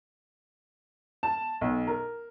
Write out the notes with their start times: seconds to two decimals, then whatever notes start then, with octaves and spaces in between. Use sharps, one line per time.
1.23 A5
1.61 B1
1.87 A#4